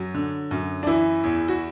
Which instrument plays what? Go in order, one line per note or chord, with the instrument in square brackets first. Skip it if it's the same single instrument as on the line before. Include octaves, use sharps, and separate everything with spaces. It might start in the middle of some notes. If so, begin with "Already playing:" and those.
Already playing: [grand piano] F#2 F#3
D3
F#2
D4
E3 E4
E2
F#4